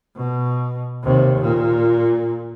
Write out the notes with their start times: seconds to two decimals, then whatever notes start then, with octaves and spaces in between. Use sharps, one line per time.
0.16 B2
1.03 D#2 C3
1.41 A#2